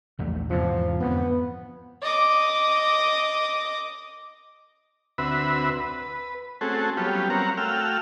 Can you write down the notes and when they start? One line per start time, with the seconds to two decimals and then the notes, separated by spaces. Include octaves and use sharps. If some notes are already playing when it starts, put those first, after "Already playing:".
0.19 A#1 E2 A3
0.50 E2 G#2 C3 F3
1.00 F2 G#2 D3 B3
2.02 D#5 D6
5.18 D2 C4 F#4 B4 E5 B5
5.80 B4
6.61 A3 C4 C#4 F#4 G#4 A4
6.97 F#3 G3 B3 C#4 F4 G4
7.30 C4 A#4 C#5 F5 F#5 A#5
7.57 A3 F#4 F5 G5 E6 F6